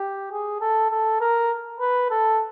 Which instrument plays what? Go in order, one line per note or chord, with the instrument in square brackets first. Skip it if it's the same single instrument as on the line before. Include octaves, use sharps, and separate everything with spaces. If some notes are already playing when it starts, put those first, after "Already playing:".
Already playing: [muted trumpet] G4
G#4
A4
A4
A#4
B4
A4